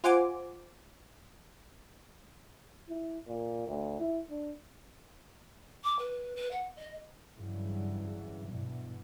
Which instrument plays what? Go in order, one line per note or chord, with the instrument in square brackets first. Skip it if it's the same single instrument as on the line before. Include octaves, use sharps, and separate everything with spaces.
[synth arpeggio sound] F4 C5 F#5 G#5 D6
[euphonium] E4
A#2
D2
E4
D4
[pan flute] D6
B4
B4
F#5
D#5
[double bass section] G2 C#3 E3 F#3 G3
G2 B2 E3